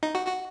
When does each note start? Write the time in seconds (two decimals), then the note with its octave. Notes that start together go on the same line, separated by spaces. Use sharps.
0.03 D#4
0.15 F#4
0.27 F#4